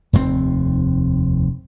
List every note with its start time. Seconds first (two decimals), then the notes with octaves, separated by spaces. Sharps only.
0.13 F1 D#2 A#2 C4